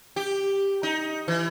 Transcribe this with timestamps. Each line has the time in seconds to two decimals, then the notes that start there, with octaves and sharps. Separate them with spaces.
0.16 G4
0.83 D#4
1.28 E3